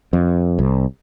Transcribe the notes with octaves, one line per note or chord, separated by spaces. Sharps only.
F2
C2